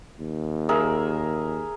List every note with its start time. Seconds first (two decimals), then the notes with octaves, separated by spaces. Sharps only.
0.20 D#2
0.69 G#4 A#4 E5